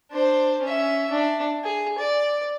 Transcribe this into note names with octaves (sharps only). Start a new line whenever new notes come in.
D4 C5
C#4 E5
D4
G#4
D5